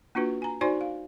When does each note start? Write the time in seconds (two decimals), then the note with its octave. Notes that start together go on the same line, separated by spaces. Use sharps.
0.15 A#3 D4 F4 F#4 B4
0.42 G#5 A#5
0.61 D#4 F#4 C5 D5 G#5 C6
0.81 F5